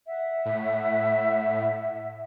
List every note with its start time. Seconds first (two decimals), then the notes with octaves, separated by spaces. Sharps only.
0.07 E5 F#5
0.45 A2